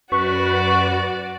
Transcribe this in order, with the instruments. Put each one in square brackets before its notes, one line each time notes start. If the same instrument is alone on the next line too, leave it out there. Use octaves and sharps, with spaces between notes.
[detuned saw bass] F#2 [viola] F#4 D5 [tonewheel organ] B4 [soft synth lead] C#6